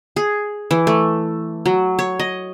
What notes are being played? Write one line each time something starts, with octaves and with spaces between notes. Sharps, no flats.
G#4
E3
A3
F#3
C#5
D#5